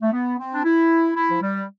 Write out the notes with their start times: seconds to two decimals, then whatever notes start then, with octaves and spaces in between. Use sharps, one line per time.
0.02 A3
0.13 B3
0.39 C4
0.54 D4
0.65 E4
1.16 E4
1.30 F3
1.42 G3